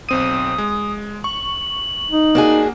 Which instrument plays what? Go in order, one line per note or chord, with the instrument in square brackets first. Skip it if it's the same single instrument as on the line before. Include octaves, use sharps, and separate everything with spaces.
[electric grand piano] B1 C4 D#7 [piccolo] D#6
[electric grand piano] G#3
[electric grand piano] C#6 [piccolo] F#7
[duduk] D#4
[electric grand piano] A#3 [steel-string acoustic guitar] D4 F#4 G#4